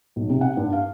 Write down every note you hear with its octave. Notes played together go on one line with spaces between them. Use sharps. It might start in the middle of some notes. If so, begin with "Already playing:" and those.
B1
C3
F#5
G2
F5